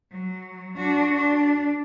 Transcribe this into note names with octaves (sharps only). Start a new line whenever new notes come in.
F#3
D4 F#4
D4